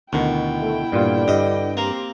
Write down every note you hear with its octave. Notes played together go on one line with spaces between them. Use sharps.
D2 B2 D#3 E4 G5
A3
G2 A#2 D3 G3 F4 D5
G2 D#5
A#3 C4 G4